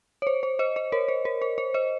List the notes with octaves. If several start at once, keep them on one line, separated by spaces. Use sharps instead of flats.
C#5
C5
C5
C5 D#5
C5
A#4 C#5
C5
A#4
C5
C5
C5 D#5